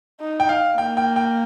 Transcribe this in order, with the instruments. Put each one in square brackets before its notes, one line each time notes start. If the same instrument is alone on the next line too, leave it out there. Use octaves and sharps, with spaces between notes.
[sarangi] D#4
[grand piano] G5
F5
[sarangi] A#3 [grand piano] G5
[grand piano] G5
G5